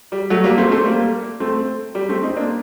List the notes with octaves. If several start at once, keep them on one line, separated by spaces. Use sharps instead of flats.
G3
F#3 A3
G3 A#3
A3 C4
A3 C4
G3 A#3
A3 C4
G3
A3 C4
C4 D#4
A#3 D4